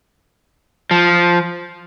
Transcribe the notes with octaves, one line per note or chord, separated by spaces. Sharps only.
F3